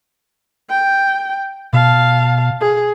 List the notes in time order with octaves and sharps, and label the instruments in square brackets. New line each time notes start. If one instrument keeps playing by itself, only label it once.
[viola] G5
[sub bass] B2 [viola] F5 A5
[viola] G#4